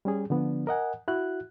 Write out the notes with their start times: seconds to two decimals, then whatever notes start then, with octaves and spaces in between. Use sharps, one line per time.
0.05 G3 C#4 G#4
0.30 D3 F3 B3 D4
0.67 A#4 D#5 F#5 G#5
1.08 E4 F#4 F#6